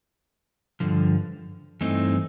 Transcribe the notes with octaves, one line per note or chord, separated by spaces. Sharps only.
G2 D3 F3
G2 E3 A3 C4 D#4